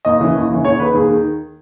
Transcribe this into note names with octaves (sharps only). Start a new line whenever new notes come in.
D#2 D#5
C#3 E3
D#2
C#3 E3
D#2 C#5
D#3 B4
D#2 G#4
D#3